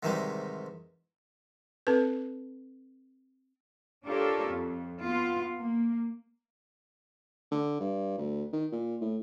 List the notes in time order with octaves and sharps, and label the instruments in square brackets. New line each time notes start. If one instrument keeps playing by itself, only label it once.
[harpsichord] G#2 C3 D#3 E3 G3 G#3
[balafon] C4 A4 B4
[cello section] D4 F4 G4 A4 A#4 C#5
F2
B3 F4
A#3
[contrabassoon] D3
G2
D2
D#3
A#2
A2